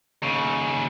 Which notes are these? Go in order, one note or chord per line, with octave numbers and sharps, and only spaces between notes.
D#2 C#3